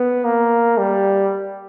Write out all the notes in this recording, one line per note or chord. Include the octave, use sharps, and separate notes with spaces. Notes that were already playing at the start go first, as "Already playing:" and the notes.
Already playing: B3
A#3
G3